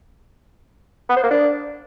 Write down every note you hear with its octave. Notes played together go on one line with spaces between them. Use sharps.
B3
C5
A#3
D4